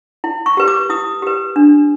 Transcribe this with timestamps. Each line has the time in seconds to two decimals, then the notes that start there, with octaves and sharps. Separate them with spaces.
0.24 E4
0.46 C#6
0.57 G4 B4
0.68 D6
0.90 E4 D#6
1.22 G4 B4
1.56 D4